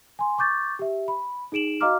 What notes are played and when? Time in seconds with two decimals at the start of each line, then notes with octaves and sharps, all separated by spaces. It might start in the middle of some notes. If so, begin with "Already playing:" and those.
0.19 G#5 C6
0.38 C#6 D6 G6 A6
0.79 G4 E5
1.08 B5
1.52 D#4 G#4 D7 E7 F#7
1.81 F#4 D#5 F5 A#5 D6 F6